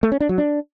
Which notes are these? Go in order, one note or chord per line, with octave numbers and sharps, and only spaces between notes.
A3
C#4
D4
F#3
D4